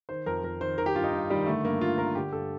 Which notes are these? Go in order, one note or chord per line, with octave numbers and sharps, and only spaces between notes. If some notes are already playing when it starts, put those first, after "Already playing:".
D#3 C5
F2 A#4
F2 A#4
D#3 C5
D#3 A#4
G4
G2 F4
D#4
G2
D#3 G3
D3 A3
G2 A#3
G2 F4
D3 A#4
D3 G4
G2 A4